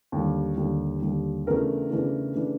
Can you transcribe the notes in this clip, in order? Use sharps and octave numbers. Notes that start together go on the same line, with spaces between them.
D#2 D3 G3
D#2 D3 G3
D#2 D3 G3
E2 C#3 E3 A3 D4 A#4
E2 C#3 E3 A3 D4
C#3 E3 A3 D4